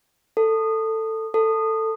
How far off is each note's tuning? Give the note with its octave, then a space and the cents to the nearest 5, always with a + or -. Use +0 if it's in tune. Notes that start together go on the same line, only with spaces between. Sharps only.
A4 +15
A4 +15